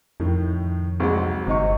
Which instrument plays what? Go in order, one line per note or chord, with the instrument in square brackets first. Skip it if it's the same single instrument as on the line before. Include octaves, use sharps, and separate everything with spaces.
[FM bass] F2 [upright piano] A2 D#3
[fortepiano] C2 [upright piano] G#2 F#3 G#3
[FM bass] G1 [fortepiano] C3 D#4 C#6